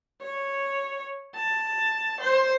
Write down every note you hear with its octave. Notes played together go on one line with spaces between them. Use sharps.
C#5
A5
C5